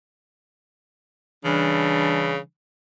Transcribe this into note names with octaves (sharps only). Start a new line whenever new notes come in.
C#3 E3 G3 D4